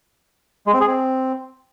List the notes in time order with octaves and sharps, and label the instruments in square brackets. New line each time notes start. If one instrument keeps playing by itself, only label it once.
[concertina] G#3
C4
G#4
C4